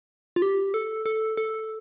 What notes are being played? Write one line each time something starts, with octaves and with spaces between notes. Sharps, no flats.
F4
G4
A4
A4
A4